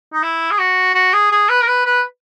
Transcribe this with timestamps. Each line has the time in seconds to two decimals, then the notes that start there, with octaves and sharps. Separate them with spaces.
0.13 D#4
0.23 E4
0.51 G#4
0.59 F#4
0.95 F#4
1.13 G#4
1.32 G#4
1.49 B4
1.62 A#4
1.67 B4
1.85 B4